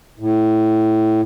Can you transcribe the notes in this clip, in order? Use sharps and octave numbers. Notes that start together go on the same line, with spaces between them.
A2